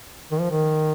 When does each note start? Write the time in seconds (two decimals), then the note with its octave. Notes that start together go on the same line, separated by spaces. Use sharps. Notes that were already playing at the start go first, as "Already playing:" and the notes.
0.31 D#3
0.40 F3
0.50 D#3